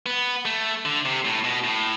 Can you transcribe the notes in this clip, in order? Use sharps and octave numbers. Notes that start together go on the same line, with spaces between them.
B3
A3
D3
C3
A2
B2
A2